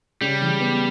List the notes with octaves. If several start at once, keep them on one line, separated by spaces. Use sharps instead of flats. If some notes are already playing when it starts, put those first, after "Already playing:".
C#3 G3
E3
B3